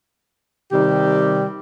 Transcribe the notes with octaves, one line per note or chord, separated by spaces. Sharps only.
C3 D#3 G3 G4